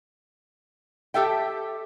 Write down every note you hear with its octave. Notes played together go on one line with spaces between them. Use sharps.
G4 A4 E5 G5